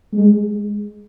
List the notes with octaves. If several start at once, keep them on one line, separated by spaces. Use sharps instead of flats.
G#3